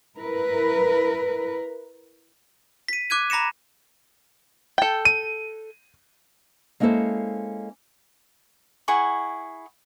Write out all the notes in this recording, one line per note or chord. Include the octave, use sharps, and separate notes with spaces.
E4 A#4 B4
B6 D#7
D6 F#6 G#6 D#7
A#5 B5 A#6 C#7 E7
A4 G5
D#7
G#3 A#3 C#4 E4 A4 C5
E4 G#4 F#5 C#6